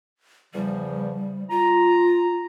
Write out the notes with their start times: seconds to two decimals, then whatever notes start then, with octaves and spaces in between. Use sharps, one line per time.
0.54 E2 C#3 F3 G3
1.50 F4 A#5